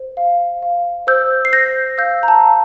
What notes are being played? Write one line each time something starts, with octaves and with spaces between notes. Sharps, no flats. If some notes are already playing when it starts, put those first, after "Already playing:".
Already playing: C5
F5
F5
C5 E6 G6
C7
C5 G6 A#6
F5 E6 G6
A#5
A5
F5